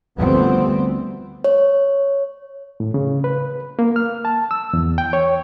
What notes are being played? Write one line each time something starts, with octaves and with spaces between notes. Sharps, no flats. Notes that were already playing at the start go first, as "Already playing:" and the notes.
D2 F3 G3 A3 B3 C4
C#5
A2
C#3
B4
A#3
F6
A5
E6
E2
G5
C#5